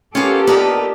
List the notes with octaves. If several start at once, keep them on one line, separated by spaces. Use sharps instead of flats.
A#3 B3 C#4 F4 G4 A4 F5
A#3 B3 D4 D#4 A#4 B4